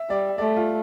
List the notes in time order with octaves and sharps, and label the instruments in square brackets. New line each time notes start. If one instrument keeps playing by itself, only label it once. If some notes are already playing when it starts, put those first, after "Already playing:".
Already playing: [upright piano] E5
[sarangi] G3 [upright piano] D5
[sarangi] A3 [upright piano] D5
[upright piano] F4